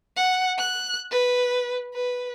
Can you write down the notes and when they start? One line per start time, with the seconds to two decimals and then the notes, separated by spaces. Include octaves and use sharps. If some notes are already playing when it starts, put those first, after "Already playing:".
0.17 F#5
0.58 F#6
1.11 B4
1.94 B4